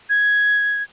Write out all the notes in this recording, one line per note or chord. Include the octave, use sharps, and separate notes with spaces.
G#6